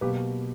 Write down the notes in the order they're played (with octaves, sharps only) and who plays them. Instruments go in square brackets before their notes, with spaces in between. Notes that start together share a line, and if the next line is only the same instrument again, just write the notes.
[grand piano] B2 F#3 A#3 G4 B4